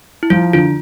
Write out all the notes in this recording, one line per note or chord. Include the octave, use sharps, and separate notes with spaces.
E4
F3 F4
D3 F4